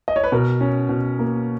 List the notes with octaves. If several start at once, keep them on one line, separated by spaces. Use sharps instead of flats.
D#5
C#5
B4
B2 A#4
C#4
B2
A#3